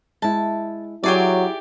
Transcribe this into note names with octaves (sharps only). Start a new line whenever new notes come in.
G#3 E4 A5
F#3 E4 G4 G#4 D5